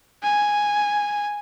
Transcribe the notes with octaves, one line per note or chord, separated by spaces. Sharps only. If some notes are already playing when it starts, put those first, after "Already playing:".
G#5